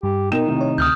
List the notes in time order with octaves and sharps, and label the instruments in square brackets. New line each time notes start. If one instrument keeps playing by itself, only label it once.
[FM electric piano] G2 [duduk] G4
[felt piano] B2 A#4 E7 [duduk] D#4 [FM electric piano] G5
[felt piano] A2 C3 D#3
[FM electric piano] C#5
[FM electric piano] D2 [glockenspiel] D#6 F6 G6